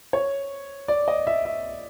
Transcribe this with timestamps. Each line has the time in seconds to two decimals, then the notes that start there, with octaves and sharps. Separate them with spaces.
0.13 C#5
0.88 D5
1.08 D#5
1.27 E5
1.45 E5